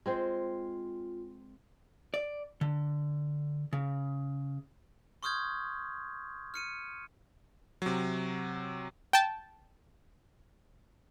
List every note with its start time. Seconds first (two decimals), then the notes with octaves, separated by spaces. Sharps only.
0.06 G#3 C4 F4 C5
2.14 D5
2.61 D3
3.73 C#3
5.23 C6 C#6 D#6 F6 G6 G#6
6.54 F6 C#7 D#7
7.82 C3 F#3
9.13 G5 A5